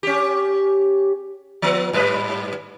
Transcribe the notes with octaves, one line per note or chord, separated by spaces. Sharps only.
C#4 G4
F3 B3
G#2 G3 B4